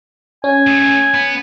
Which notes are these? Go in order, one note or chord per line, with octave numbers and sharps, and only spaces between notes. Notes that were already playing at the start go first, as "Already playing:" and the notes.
C#4 G#5
A3 G#4
B3